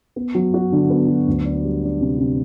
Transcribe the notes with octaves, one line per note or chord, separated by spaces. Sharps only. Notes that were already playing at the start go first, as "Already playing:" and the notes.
B3
F#3
F#4
D3
B3
F#3
D2
D4
G3
D4
C3
C3